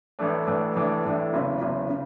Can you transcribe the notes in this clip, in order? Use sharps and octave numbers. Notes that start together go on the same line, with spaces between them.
A1 A2 E3 A3 D4
A1 A2 E3 A3 D4
A1 A2 E3 A3 D4
A1 A2 E3 A3 D4
F#1 E2 C#3
F#1 E2 C#3
C#3